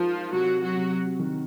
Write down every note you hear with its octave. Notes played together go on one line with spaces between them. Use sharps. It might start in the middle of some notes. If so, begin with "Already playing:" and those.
Already playing: F3 G#3 D#4 F4 A#4
C3 F#3 F#4
F#3 F#4
C3
D#3